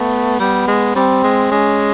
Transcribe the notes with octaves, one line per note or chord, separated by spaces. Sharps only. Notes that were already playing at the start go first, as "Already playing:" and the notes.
Already playing: A3 B3
G3 B3
G#3
G3 C4
G#3
G#3 C#4